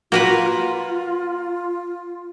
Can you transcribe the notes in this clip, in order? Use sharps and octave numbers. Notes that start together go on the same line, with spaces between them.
A#3 F4 F#4 A#4 B4